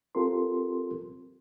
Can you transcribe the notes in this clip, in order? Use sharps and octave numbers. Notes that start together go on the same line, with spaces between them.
C4 F4 G4 A4 A#4 C6